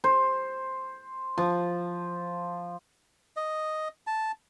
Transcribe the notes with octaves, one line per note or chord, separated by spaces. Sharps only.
C5
F3
D#5
A5